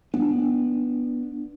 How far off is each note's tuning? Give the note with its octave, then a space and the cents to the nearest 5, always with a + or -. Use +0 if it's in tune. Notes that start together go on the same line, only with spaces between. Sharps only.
B3 -10 D4 +5